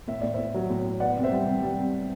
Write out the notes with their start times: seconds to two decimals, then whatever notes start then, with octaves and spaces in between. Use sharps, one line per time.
0.08 A2 E5
0.21 A2 D5
0.34 A2 C5 E5
0.54 F#3
0.70 A2
0.85 A2
1.00 B3 D5 F#5
1.16 C3
1.24 C5 E5
1.32 G3
1.46 C3
1.62 G3
1.78 C3